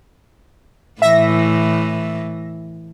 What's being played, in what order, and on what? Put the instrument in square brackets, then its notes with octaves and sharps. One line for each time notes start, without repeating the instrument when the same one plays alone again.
[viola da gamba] A2 E3 [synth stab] E5 A#6